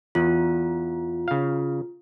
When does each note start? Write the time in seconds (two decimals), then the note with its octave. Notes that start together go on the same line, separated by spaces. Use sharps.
0.15 E2 F4
1.28 C#3 F5